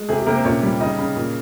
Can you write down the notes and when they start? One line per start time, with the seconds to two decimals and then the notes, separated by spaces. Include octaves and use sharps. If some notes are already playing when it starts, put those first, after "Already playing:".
Already playing: G#3
0.09 C3 G#4
0.18 G4
0.26 C3 A#3 A#4
0.36 C4 C5
0.45 A#2 C#4 C#5
0.63 G3
0.80 C#3 D#4 D#5
0.98 C#3
1.16 A#2